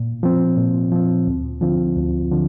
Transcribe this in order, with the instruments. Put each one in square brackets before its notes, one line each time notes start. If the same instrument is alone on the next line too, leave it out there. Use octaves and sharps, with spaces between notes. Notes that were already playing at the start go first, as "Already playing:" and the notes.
Already playing: [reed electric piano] A#2
F3 C4
A#2
F3 C4
D2
D3 F3 C4 F4
D2
D3 F3